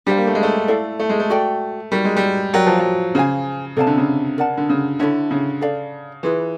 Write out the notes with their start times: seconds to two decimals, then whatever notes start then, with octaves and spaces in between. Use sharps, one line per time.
0.06 G3 D4 G4 C5 F5
0.17 A#3
0.27 A3
0.35 G#3
0.43 A3
0.68 E4 A4 D5 F5
0.99 A3
1.09 G#3
1.20 A3
1.30 F#4 A4 D5 G5
1.91 G3 D#4 F#4 A#4 D5
2.05 G#3
2.16 G3
2.53 F#3 G4 A#4 D5 G5
2.67 F3
2.79 F#3
3.15 C#3 G#4 C5 F5 G#5
3.77 C3 A4 D5 F5 A5
3.87 D3
3.97 C#3
4.38 A#4 D5 F#5 A5
4.57 D3
4.69 C#3
4.99 D3 E4 A4 C#5 E5
5.31 C#3
5.61 A4 D5 F5
6.23 E3 F4 G#4 B4